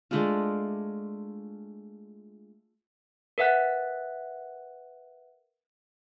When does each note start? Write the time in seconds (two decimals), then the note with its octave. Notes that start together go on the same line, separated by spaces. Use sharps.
0.11 G#3 A3 D4 F4
3.38 A#4 B4 E5 F#5 F#6